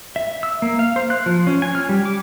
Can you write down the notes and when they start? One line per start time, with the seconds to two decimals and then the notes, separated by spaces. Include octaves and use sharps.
0.16 E5
0.43 E6
0.62 A#3
0.79 F5
0.96 C5
1.10 F#6
1.26 F3
1.47 C#4
1.62 G#5
1.75 F6
1.89 G3
2.05 D6